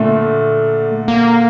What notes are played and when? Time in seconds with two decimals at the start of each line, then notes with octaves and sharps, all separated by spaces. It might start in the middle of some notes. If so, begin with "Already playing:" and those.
Already playing: A#2 D3 A3
1.08 A#3